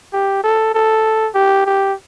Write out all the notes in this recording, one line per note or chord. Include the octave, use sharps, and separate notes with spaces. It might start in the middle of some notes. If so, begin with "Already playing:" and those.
G4
A4
A4
G4
G4